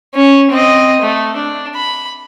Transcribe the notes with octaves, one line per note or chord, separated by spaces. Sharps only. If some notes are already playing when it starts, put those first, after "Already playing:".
C#4
C4 D#5
A3
D4
B5